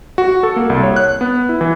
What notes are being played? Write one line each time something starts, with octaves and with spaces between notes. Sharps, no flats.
F#4
A4
A#3
C2
C#5
F#6
B3
E4
E3